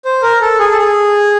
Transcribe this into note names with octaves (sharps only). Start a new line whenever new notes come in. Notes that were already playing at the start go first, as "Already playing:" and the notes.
C5
A#4
A4
G#4
A4
G#4